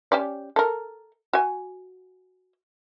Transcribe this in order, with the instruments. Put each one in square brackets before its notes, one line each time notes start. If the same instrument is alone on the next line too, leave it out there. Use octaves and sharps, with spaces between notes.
[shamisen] C#4 G4 D5
A4 A#4
F#4 G#5